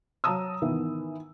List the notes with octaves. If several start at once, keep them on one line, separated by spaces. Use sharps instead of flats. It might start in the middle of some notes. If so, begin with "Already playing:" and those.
F#3 A5 A#5 D#6 E6
D#3 E3 B3